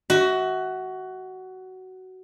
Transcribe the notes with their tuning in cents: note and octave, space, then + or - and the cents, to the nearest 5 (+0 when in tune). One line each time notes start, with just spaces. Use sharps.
F#4 +15 E5 -25